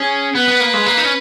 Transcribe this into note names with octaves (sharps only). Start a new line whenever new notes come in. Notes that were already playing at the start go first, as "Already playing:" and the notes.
Already playing: C#4 G#4
B3 B4
B3
A#3
G#3
A#3
D#4
C#4